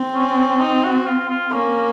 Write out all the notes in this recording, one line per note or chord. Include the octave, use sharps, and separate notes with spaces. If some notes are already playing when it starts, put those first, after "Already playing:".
Already playing: C4
C#4
D#4
F#4
F4
F4
A#3 C#4